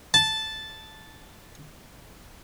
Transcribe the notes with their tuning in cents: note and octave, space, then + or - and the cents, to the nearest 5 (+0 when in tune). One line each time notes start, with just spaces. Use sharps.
A5 -5